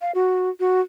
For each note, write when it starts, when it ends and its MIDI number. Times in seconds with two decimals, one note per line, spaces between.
0.01 0.12 77
0.15 0.50 66
0.60 0.81 66